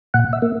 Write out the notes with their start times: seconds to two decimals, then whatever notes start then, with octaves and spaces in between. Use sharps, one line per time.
0.14 A#2 F#5
0.33 E5
0.42 A#3